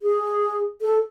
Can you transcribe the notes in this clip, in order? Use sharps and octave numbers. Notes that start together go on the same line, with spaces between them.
G#4
A4